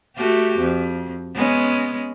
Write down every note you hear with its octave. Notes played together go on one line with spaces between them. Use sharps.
A3 F#4 G4
F2
G#3 B3 C#4